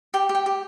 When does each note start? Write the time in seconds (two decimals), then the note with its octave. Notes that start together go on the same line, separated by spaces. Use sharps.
0.14 G4 G5
0.29 G4
0.35 G5
0.46 G4